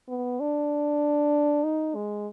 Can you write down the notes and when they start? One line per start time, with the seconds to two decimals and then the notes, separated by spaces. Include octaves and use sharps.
0.09 B3
0.40 D4
1.64 D#4
1.95 G#3